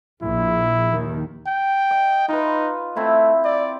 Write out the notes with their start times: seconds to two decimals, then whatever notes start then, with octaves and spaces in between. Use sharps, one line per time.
0.22 A#1 E4
0.90 D#2 D#3
1.47 G5
1.91 D#5
2.29 D#4 F4 B4
2.96 A3 C4 E4
3.44 D5